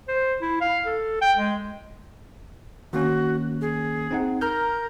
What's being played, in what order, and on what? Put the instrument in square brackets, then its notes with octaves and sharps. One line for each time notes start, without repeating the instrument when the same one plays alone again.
[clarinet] C5
E4
F5
A4
G5
G#3
[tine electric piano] D#3 A#3 C#4 [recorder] F#4
[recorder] G#4
[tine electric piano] C4 D#4 F#5
[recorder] A#4 [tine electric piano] A#5 F6 G6